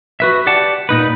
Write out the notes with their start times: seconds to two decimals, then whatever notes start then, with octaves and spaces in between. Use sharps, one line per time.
0.20 F#4 B4 E5
0.47 G4 D5 F#5 A5
0.89 A#2 D#4 B4